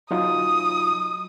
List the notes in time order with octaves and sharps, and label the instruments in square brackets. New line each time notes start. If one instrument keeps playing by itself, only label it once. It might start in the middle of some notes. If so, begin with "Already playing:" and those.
[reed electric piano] F#3 D#4 F4 [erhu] D#6